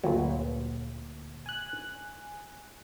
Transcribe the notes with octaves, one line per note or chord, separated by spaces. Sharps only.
G1 D2 A#2 F#3
G#5 F#6